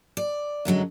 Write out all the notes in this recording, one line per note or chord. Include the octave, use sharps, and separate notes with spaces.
D5
F#2 D3 F#3 G#3